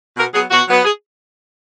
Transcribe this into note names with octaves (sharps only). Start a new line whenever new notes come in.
B2 A#4
F#3 B3 G#4
B2 F#4
F#3 B3
G#4